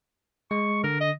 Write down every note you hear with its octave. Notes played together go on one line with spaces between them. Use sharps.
G#3 C#6
D3 A#4
D#5